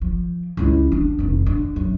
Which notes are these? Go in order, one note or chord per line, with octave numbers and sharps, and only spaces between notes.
F3
C#2 E4
B3 D4
F1 D#3
D3
F#2